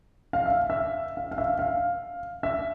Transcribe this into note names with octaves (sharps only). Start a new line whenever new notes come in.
F5
E5
E5
F5
F5
E5
F5
E5